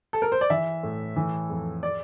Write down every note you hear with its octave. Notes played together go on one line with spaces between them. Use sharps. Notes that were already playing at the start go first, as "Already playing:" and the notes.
A4
A#4
C5
D5
E3 E5
A2
E3
F2
D5